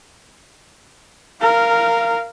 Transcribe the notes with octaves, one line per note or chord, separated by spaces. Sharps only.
A#4 F5